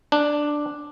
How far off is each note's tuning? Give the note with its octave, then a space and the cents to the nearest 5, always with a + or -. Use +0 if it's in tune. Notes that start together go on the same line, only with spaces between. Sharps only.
D4 +5